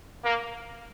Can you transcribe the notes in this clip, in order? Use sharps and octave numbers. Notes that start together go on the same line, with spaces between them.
A#3